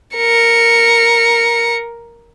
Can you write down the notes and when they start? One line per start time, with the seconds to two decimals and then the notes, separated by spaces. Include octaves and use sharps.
0.16 A#4 C#7